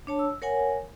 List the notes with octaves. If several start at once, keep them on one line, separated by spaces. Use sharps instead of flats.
D4 C#5 A5
E6
A#4 C#5 F#5 G#5